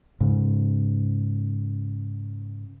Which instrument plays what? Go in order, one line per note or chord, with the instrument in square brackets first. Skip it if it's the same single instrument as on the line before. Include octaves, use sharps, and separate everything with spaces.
[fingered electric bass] G#2 C#3